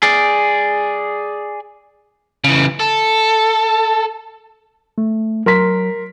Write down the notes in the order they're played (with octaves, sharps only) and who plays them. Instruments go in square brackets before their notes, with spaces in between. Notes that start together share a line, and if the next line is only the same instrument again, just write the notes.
[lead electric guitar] G#4 D5
[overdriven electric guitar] C#3 E3
A4
[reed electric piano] A3
[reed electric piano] F#3 [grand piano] A#4 C6 B6